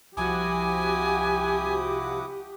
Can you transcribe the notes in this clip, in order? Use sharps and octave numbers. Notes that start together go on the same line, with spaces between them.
C2 F3 E4 F#4 G4 G#5 D6 D#6